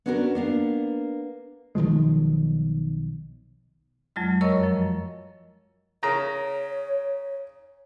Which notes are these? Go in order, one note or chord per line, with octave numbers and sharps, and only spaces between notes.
B3 C#4 D4 F#4 A#4
A#3 B3 D4
B1 D#3 F3 G#3
F2 F#3 G#3 F4
F#2 A#4 C#5 D#5 C#6 E6
F#2 F3
C#3 A#4 C#5 A#5